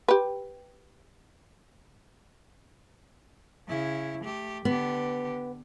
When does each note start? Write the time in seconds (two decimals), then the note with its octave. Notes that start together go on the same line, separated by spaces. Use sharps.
0.08 G4 B4
3.67 C#3 E4
4.23 A3 G4
4.65 D3 B3 G4